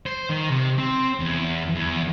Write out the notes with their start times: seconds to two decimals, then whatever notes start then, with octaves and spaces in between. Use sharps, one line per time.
0.06 C5
0.30 D#3
0.49 C3
0.78 C4
1.20 E2
1.75 E2